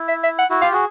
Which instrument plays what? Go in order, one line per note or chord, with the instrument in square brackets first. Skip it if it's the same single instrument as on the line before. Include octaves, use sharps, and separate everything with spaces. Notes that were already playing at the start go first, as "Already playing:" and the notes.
Already playing: [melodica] E4
[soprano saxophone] E5
E5
F#5
[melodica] E4 F#4
[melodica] F4 G4 [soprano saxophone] F5
[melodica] F#4 G#4